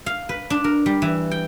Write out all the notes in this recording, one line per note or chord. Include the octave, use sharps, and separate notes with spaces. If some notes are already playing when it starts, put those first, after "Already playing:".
F5
B4
D4
A#4
G3
E3
G5